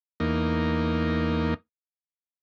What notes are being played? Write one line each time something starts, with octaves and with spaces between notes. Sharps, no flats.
E2 A#3 D#4